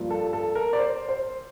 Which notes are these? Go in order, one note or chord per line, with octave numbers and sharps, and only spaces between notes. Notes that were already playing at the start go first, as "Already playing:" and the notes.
Already playing: G2 F3 A#3 F4
A4
A4
A#4
D5
C5
C5